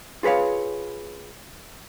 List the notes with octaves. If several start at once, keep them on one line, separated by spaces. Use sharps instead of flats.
F4 G#4 B4 C#5 F5